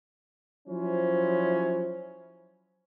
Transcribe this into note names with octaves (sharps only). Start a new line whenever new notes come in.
F3 F#3 C#4 E4 C5